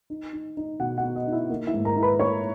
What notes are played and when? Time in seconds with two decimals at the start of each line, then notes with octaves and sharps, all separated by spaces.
0.10 D#4
0.33 D#4
0.57 D#4
0.80 B2 F#4 F#5
0.98 F#4 F#5
1.03 B3
1.15 D#5
1.26 D#4
1.32 E4 E5
1.50 A#3
1.67 E4 E5
1.74 G#2
1.85 A#4 A#5
1.97 E4
2.02 B4 B5
2.19 A#3 C#5 C#6